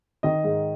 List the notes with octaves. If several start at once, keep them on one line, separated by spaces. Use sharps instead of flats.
D#3 D#5
G#2